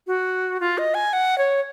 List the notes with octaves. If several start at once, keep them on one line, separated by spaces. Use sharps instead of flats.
F#4
F4
D#5
G#5
F#5
C#5